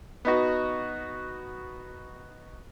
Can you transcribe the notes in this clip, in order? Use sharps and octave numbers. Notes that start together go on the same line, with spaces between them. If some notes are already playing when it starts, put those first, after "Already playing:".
B3 D#4 F#4